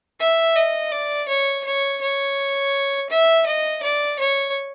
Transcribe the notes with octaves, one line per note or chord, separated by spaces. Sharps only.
E5
D#5
D5
C#5
C#5
C#5
E5
D#5
D5
C#5